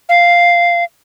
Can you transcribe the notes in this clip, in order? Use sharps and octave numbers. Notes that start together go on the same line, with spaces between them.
F5